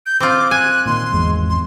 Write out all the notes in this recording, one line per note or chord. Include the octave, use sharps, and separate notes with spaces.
G6
C4 F4 D6
G#5 F#6
A#2 D#3 C6
G#1 E2 G#3
C6